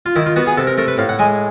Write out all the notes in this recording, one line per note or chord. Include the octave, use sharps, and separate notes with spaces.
F4
D#3 E4
F4
B3 F#4
G#4
C3 A4
A#4
A3 A#4
B4
A2 F5
F#5
G#3 G#5